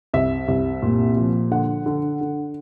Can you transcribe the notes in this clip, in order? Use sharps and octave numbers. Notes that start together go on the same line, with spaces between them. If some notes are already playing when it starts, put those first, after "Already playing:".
C2 E5
C2
A#2
F3
D3 F#5
D3
D3